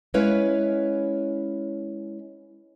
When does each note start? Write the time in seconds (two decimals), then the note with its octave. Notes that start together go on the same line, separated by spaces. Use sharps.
0.14 G#3 C#4 E4 B4 C#5 F5